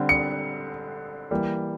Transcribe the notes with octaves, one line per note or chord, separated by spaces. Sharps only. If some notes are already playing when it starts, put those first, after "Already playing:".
Already playing: D3 G3 C4
C#7
E3 G3 A#3